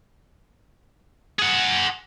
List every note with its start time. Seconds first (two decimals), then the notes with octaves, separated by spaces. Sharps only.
1.39 G#4 F#5